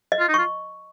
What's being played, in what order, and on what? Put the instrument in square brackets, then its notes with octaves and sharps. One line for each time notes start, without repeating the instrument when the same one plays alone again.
[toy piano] D#5
[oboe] F4
D#4
[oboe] F4 [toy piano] C#6